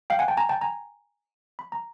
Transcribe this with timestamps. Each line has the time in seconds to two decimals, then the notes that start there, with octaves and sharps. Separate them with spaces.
0.10 F5 G5
0.19 F#5 G#5
0.28 G5 A5
0.37 G#5 A#5
0.49 G5 A5
0.61 G#5 A#5
1.59 B5
1.72 A#5